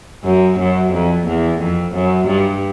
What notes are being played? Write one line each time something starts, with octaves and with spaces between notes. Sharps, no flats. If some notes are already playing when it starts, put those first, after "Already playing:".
F#2
F#2
F2
E2
F2
F#2
G2